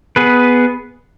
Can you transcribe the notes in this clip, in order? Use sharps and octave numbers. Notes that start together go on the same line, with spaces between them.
B3 G#4 B4